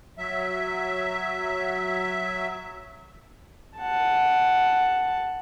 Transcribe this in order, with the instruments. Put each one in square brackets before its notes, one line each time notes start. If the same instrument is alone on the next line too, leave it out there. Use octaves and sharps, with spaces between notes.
[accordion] F#3 E5
[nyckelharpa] F#5 A5